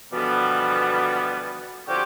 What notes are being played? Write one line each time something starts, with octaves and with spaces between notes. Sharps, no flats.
B2 D3 E3 F3 G3 B3
D3 F3 C4 C#4 F#4 G4